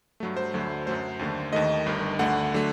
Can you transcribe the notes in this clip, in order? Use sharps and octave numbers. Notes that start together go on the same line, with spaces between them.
G2 F#3 A3
C5
D2 D3 F#3 A3
F#2 F#3 A3 C5
D#2 D3 A3
D#2 D#3 A3 D#5
G1 G2 D#3
D2 D3 A3 F#5
D3 F#3 A3